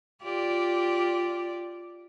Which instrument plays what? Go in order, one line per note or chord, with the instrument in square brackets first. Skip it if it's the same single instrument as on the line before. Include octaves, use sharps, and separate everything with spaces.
[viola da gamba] F4 G4 D5